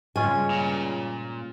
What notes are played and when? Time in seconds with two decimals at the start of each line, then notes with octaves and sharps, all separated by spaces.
0.16 G2 C#3 G#3 C#4 F4 G#5
0.50 A#2